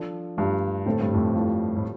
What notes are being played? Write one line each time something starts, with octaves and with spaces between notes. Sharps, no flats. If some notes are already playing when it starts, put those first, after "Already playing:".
Already playing: F3 D4 A4
G2 F3 A3 D4 F4
A2 D3 A3 C4 A4
G2
F2 A2
A2 G3 F4 A4
A2